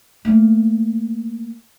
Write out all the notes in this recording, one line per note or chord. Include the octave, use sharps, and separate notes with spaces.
A3 A#3